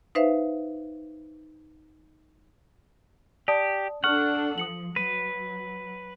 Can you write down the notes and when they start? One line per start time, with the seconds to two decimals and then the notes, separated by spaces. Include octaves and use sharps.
0.15 D#4 B4 C5 E5 F5
3.48 G4 D5 A5 D#6
4.04 D4 A4 F#5 C#6 F6
4.58 F3 D#6 C#7 F#7
4.96 F#3 B4